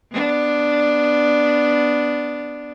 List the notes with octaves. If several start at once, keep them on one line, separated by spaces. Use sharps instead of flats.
B3 D4